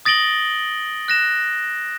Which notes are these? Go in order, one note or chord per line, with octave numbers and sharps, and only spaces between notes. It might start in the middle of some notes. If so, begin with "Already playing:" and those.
D#6 A6 A#6 D7 F#7 G7
F#6 A#6 E7